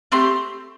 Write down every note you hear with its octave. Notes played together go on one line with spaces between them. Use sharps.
A3 C4 G4 C6